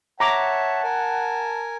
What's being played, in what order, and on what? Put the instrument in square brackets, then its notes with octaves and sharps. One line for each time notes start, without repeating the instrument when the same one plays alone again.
[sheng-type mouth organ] C#5 E5 [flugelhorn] F#5 [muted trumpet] A5 [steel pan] A#5 D6
[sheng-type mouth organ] A#4 G#5